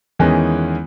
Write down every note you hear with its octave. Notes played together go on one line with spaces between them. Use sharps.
E2 D#3 E3 G#3 B3 C#4